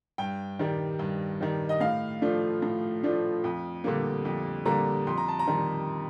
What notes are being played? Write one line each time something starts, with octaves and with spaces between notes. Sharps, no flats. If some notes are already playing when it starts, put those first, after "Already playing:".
G2 G5
D#3 G3
G2
D#3 G3
D#5
A2 F5
F3 A3 D4
A2
F3 A3 D4
F2
D3 G3 A#3
F2
D3 G3 A#3 A#5
F2 C6
A#5
A5
A#5
D#3 G3